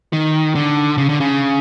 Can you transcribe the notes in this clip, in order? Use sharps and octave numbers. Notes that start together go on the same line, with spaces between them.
D#3
D3
C#3
D3
C#3